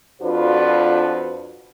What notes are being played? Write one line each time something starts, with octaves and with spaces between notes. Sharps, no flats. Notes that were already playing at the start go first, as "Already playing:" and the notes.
F2 D4 F4 F#4 B4 C5